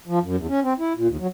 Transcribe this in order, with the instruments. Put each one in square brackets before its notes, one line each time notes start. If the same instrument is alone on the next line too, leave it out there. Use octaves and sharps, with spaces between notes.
[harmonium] F3
F#2
E2
C#4
C4
E4
A#2
D#2
F#3